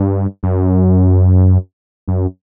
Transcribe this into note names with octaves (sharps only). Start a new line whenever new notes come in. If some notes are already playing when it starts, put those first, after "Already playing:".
Already playing: G2
F#2
F#2